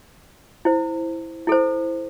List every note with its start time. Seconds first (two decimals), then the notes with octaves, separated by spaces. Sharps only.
0.65 E4 C5
1.47 E4 A4 C5